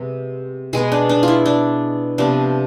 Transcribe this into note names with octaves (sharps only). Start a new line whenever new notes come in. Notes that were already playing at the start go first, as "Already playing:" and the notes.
Already playing: C3 G#3 B3
B2 G#3 B3 G#4
D4
D4
E4 F4
D4
C3 F3 B3 D4